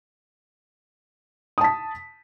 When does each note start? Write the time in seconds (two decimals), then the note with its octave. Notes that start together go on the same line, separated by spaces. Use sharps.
1.58 D#6
1.61 A5
1.64 B6